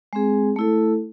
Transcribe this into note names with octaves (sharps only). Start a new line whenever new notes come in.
G#3 C4 G#4
A3 E4 A4